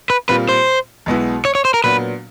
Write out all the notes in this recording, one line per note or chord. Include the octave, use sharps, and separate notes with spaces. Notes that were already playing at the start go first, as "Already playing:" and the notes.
B4
A#2 G3 C4 F4 B4
C5
B1 B2 G#3 B3 E4
C#5
C#5
C5
A#4
A#2 F#3 B3 D4 B4